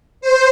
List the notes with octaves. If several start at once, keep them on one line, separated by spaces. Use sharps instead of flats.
C5